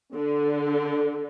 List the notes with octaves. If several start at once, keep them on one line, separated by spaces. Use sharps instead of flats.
D3